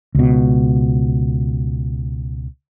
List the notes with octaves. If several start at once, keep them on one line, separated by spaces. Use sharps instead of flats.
C#2 B2